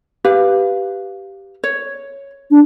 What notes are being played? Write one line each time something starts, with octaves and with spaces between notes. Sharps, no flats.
G4 B4 F5
C#5
D4